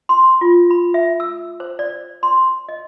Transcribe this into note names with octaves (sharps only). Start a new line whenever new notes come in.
C6
F4
B5
E5
E6
C5
D5
C6
D#5